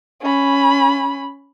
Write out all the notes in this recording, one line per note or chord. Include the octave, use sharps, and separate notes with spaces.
C#4 B5